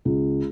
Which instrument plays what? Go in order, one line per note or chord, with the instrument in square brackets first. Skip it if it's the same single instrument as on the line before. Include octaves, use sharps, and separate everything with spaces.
[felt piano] C#2